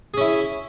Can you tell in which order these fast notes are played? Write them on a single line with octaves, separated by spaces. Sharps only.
G#4 C#4 E4